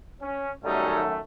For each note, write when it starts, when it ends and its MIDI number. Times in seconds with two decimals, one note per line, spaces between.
0.21 0.51 61
0.65 1.20 42
0.65 1.20 51
0.65 1.01 55
0.65 1.20 57
0.65 1.01 61
0.65 1.01 63